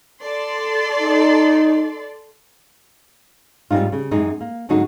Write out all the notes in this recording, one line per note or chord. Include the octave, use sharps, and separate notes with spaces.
A4 D5 C6
D#4
G#2 G3 C4 D#4 F4
C#3
F#2 E3 G#3 C4 D#4
A#3
G#2 D3 F#3 G#3 D#4 F#4